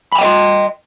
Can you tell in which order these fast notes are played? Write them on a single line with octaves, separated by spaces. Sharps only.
B5 G#5 G5 D#5 C6